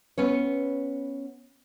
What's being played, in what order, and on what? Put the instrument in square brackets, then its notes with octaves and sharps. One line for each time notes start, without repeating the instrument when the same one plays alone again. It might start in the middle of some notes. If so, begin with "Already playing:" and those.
[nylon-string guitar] B3 C#4 C#5